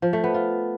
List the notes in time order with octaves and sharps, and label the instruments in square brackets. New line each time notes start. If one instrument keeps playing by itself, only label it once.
[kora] F3
A3
B3
F4